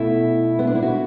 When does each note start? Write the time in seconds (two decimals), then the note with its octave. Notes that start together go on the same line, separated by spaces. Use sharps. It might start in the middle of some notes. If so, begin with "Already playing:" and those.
Already playing: B2 A3 E4
0.59 B3
0.67 D4
0.75 E4
0.82 F#4